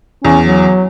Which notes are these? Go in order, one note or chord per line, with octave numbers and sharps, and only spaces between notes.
E2 C#4
F#3